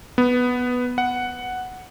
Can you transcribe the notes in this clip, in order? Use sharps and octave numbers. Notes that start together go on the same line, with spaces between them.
B3
F#5